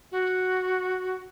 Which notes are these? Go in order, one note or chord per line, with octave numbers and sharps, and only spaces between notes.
F#4